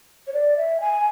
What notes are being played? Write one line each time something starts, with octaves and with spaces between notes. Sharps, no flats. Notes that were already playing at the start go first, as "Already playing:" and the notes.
C#5
D5
E5
G#5